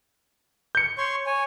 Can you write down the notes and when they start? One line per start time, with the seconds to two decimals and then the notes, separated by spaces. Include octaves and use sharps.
0.75 G6 C#7
0.98 C#5 C6 C#6
1.26 C#5 G#5